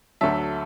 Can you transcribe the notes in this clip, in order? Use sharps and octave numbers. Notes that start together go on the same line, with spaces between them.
D2 D3 F#3 E5 A5